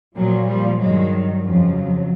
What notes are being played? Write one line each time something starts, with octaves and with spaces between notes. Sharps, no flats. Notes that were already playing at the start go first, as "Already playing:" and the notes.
A#2 F3 F#3
F3 G3
G2 D#3 F#3 G#3
F#3
F2 C#3 F3